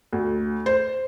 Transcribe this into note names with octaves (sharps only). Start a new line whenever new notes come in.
D2
C5